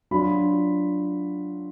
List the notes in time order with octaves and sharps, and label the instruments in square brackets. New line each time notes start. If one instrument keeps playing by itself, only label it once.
[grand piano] F#3 D4 F4 B5